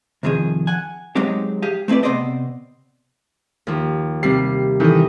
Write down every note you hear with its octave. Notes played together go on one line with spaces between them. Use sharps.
C2 F2 D#3 F3 G#4
F#5 G#5
F#3 G#3 C4 D#4 G4
G4 G#4 F5
A3 C4 E4 B4 D5
C3 B3 C4 C5 D5 D#5
D#2 F3
C3 G3 C7
D#3 E3 E4 A4 D#5